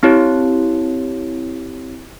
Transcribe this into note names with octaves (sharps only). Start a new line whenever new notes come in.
C4 E4 G4 C#5